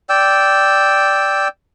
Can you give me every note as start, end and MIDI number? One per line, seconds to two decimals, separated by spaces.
0.09 1.48 74
0.09 1.48 79
0.09 1.48 88